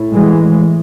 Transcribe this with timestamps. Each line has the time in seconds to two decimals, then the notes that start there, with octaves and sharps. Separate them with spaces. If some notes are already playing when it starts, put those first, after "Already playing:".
Already playing: A2 E4
0.12 E3 G#3